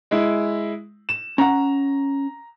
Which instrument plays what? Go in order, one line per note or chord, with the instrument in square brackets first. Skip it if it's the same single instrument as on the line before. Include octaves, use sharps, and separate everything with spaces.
[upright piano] G#3 E4
E7
[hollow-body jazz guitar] C#4 F#5 [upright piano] A#5